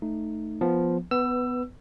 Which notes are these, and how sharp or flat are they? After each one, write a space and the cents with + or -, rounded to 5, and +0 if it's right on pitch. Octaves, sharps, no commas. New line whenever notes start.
A3 +0 D#4 -5
F3 +0 B3 +0
B3 +15 B4 +0 E6 +20